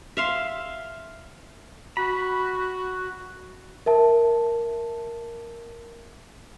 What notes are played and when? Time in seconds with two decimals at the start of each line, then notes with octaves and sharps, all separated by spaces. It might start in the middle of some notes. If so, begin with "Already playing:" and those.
0.17 E5 F5 C6
1.97 F#4 B5
3.86 A#4 E5 A5